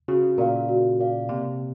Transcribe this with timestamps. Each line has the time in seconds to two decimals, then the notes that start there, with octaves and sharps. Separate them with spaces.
0.08 C#3 F#4
0.38 A#2 A#4 D5 F5
0.69 F#4
0.99 A#4 D5 F5
1.29 C3 A#3